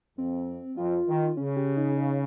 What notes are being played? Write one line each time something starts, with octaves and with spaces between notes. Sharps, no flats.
F2 C4
F2 F4
D#3
C#3 C#4
G4
D#4
D#4